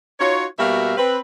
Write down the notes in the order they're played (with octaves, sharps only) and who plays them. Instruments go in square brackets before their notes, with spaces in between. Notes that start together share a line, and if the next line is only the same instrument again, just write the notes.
[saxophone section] D#4 F4 F#4 C#5
B2 G3 A#3 F#4 E5 F5
C4 B4